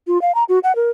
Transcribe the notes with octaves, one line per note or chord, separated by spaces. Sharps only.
F4
F5
A#5
F#4
F#5
A#4